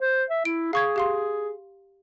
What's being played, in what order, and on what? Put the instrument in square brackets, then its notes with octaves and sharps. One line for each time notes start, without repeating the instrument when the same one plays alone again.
[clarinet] C5
E5
[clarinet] E4 [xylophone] D7
[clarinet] G#4 [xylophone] F5 C#6 G#6
[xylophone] G4 F5 C6